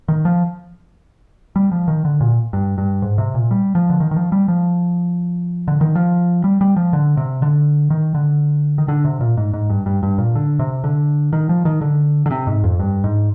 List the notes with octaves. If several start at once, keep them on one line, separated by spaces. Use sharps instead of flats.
D#3
F3
G3
F3
D#3
D3
A#2
G2
G2
G#2
C3
A#2
G3
F3
D3
D#3
D#3
F3
G3
F3
D3
D#3
F3
G3
G3
F3
D3
C3
D3
D#3
D3
D#3
D3
C3
A#2
G#2
G#2
G2
G2
G2
A#2
D3
C3
D3
D#3
F3
D#3
D3
D3
C3
G#2
F2
G2
G#2